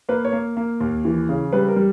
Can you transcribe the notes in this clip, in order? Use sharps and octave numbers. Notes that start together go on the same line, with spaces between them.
A#3 B4
C#5
A#3
A#3
D#2
E3
C#3
G3 B4
A#4
G3